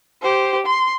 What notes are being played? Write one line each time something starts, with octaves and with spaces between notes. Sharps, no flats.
G4 C5
C6